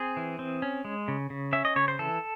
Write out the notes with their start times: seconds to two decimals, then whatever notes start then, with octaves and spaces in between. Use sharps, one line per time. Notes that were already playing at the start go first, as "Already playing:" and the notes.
Already playing: C4 G#4
0.17 E3
0.39 C4
0.62 C#4
0.85 G#3
1.08 C#3
1.30 C#3
1.53 C#4 E5
1.65 D#5
1.76 C#3 C#5
1.88 C5
1.99 E3 A4